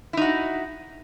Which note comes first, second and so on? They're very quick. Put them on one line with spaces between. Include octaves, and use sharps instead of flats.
E4 D#4 F#4